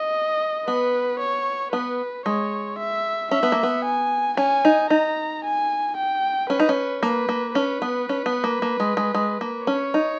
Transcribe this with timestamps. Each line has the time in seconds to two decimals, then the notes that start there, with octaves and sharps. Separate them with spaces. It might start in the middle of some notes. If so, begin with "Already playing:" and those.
Already playing: D#5
0.66 B3 B4
1.20 C#5
1.73 B3 B4
2.26 G#3 C#5
2.78 E5
3.31 C#4 E5
3.43 B3
3.52 A#3
3.63 B3
3.85 G#5
4.37 C#4 G#5
4.65 D#4
4.90 D#4 A#5
5.44 G#5
5.96 G5
6.50 C#4 B4
6.60 D#4
6.69 C#4
7.03 A#3 B4
7.29 A#3
7.55 C#4 B4
7.82 B3
8.09 C#4
8.26 B3
8.44 A#3
8.62 A#3
8.80 G#3
8.97 G#3
9.14 G#3
9.41 A#3
9.67 C#4 C#5
9.94 D#4